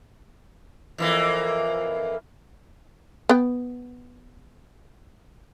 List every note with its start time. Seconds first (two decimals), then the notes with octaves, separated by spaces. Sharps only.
0.98 F2 E3 A#3
3.29 B3 G5